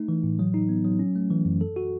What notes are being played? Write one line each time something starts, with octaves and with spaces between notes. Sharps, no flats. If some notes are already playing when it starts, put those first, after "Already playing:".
Already playing: A3 D#4
E3
A2
F#3
D#4
B3
F#3
C#4
A3
E3
F#2
A4
F#4